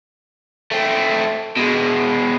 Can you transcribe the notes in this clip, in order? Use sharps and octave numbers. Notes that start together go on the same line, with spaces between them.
A3 C4
B2 G#3